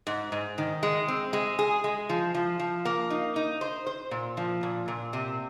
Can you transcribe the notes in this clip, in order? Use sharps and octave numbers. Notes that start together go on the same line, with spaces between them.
G#2
G#2
D#3
G#3
C4
G#3
G#4
G#3
F3
F3
F3
A#3
D#4
D#4
C5
C5
A#2
F3
A#2
A#2
C3